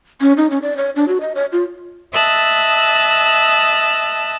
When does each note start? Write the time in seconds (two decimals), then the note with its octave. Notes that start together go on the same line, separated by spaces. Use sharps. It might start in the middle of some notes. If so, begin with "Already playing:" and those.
0.21 C#4
0.37 D#4
0.51 C#4
0.63 D5
0.77 C#5
0.96 D4
1.08 F#4
1.21 D#5
1.35 C#5
1.52 F4
2.13 D#5 E5 A5 E6 F#6